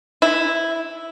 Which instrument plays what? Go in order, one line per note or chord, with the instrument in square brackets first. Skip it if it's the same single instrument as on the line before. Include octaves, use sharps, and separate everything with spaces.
[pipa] E4